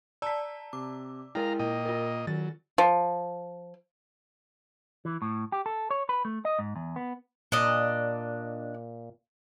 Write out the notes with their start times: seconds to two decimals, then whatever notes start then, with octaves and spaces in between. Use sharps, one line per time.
0.22 D5 A5 A#5 E6 B6
0.73 C3 D6
1.35 G#3 E4 A#4 F5 G5 A#5
1.59 A#2 D#5 G5
1.85 F4 A#4
2.27 D#3 F#3 A6
2.78 F3
5.05 E3
5.22 A2
5.52 G4
5.66 A4
5.90 C#5
6.09 B4
6.25 A3
6.45 D#5
6.59 G#2
6.76 E2
6.96 B3
7.52 A#2 D4 D5 D#5